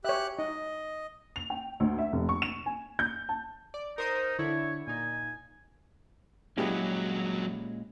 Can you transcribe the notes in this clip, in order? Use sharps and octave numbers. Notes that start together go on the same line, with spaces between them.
G4 C#5 E5 F#6
D#4 D#5
F7
G5
D2
E5
F1
C#6
E7
G#5
G6
A5
D5
D#4 A#4 C5 D#6
D3 E4 C#5
A#2 D#4 G#5
G2 A#2 F#3 G#3 C#4 E4 G4 G#4